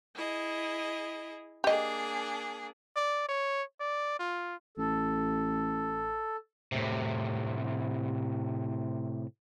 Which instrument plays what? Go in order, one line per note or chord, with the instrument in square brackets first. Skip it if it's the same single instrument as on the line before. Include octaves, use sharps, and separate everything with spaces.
[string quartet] E4 G#4 D#5
[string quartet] A#3 D4 G#4 [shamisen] G4 D#5
[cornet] D5
C#5
D5
F4
[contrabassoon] A1 [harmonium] A4
[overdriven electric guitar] A2 C3